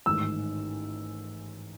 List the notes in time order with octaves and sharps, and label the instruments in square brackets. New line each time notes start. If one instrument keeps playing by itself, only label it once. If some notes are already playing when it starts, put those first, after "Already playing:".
[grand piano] A1 G#2 D#3 E6